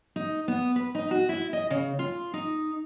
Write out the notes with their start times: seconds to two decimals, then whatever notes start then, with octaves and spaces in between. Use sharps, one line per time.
0.16 D#4
0.48 B3
0.76 B4
0.95 D#4
1.11 F#4
1.29 E4
1.53 D#5
1.70 C#3
1.99 F4
2.34 D#4